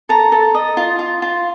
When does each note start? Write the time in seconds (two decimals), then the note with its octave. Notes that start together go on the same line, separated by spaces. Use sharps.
0.09 A4 A#5
0.32 A4
0.54 D#5
0.77 F4
0.99 F4
1.22 F4